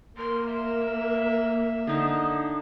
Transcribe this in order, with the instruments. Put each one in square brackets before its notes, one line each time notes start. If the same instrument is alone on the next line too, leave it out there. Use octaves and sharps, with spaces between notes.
[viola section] A#3 [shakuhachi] A#4 [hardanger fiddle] C6
[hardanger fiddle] E5
[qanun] D3 D#4 [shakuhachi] D#6